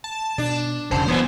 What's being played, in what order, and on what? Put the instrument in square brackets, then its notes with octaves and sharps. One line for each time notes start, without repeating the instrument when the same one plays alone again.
[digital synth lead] A5
[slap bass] B2 [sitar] D4
[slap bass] E1 [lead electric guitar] C#3 A5 [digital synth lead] C5
[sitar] A#2 E3 F#3 [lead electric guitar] B3